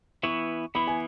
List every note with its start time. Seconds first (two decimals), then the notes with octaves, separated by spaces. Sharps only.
0.23 E3 B3 E4 C#6
0.75 E3 B3 E4 B5
0.87 G#5